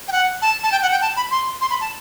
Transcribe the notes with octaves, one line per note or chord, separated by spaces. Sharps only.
G5
F#5
A5
A5
G5
F#5
G5
A5
B5
C6
C6
B5
A5